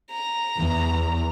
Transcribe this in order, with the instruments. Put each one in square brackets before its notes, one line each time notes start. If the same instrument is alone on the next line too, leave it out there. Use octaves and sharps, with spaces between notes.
[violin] A#5
[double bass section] E2